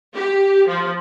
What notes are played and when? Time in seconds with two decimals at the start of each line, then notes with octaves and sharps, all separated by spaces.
0.15 G4
0.68 F3